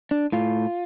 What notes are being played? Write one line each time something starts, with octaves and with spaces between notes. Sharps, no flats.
D4
A2 F4